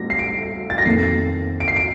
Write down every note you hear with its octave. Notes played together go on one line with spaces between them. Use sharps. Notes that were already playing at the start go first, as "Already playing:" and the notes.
Already playing: A2 G3 C4 A#6
C7
D7
A6
A#6
F2 D#3 A#3 C7
D7
C7
D7